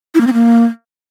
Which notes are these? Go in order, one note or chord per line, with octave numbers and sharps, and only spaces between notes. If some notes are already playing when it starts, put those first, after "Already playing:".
E4
A#3
C4
A#3